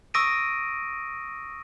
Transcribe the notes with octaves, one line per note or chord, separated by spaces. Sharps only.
C#6 D#6 E6 A#6 D7 D#7